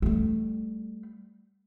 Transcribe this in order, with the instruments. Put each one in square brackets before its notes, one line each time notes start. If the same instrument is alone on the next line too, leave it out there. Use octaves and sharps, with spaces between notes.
[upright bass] G3 A3